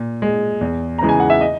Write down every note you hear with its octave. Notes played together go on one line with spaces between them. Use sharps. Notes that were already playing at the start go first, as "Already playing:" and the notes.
Already playing: A#2
G#3
E2
C#3 E3 G#3 A#5
G#5
F#5
E5
D#5